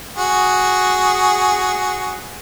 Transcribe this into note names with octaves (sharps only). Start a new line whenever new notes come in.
F#4 G#4